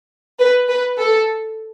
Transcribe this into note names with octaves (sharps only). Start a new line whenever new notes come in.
B4
B4
A4